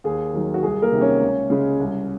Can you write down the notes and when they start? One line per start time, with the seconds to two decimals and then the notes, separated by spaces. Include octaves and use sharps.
0.04 D#2 G#4
0.34 D#3 F#3
0.54 F#4
0.63 C2 G#4
0.82 A#3 A#4
0.92 C3 D#3
1.01 C#4 C#5
1.21 C#2
1.50 C#3 G#3
1.80 C2